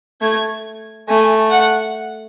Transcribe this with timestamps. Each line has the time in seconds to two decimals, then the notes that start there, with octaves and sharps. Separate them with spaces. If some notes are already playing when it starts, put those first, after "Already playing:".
0.21 A3 G#6
1.09 A3 G#5
1.51 F#5